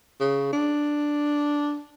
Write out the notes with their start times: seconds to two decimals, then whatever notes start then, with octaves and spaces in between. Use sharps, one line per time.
0.20 C#3
0.53 D4